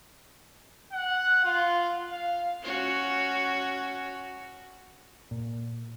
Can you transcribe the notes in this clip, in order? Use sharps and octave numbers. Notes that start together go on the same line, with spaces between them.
F#5
F4
F5
C#4 F#4
A#2